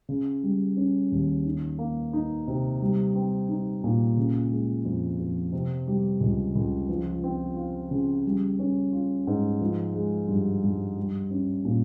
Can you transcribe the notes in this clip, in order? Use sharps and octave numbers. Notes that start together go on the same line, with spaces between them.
C#3
G3
C#4
D#2
D#3
A#3
D#4
C3
G3
C4
D#4
A#2
C#3
G#3
F2
F2
C3
G3
C#2
C#2
F3
C4
F4
C#3
G3
C#4
F4
G#2
F3
G#3
G2
G2
G3
C#4
A#2